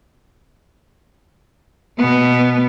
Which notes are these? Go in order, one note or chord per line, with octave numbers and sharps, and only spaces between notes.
B2 B3